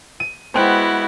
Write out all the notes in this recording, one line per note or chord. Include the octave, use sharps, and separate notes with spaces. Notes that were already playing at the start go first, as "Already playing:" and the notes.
D#7
G#3 B3 E4 F#4 C5 G5 F#6